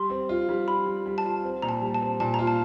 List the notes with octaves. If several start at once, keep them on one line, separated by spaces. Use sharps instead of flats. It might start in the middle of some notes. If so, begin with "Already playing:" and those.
Already playing: G3 C6
C4
F4
G3
F4 B5
G3
G3
A5
F4
C4
A#2 A#5
A5
G3
A5
C4
A#2 A5
F4 A#5
A5